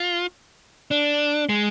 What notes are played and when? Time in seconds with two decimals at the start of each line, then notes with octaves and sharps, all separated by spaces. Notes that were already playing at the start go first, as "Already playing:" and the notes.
Already playing: F4
0.91 D4
1.49 G#3